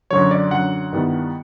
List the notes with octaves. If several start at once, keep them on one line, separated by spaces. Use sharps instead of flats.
F#2 D3 F#3 C#5
D5
F#2 D3 F#3 F#5
G2 D#3 G3 B3 E4